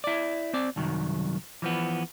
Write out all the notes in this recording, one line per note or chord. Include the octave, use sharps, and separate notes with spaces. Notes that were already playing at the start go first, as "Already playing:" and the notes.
E4 D5
C4 D5
C2 F#2 D#3 F#3
E3 F3 B3